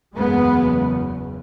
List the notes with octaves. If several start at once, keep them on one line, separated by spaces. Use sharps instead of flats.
F#1 E2 C#3 G#3 B3